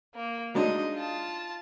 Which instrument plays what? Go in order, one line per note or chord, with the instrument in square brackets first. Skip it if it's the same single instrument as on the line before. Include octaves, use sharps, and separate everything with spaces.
[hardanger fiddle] A#3
[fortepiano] F#3 G#3 D4 [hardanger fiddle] D#4 D#5
[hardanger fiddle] F4 A5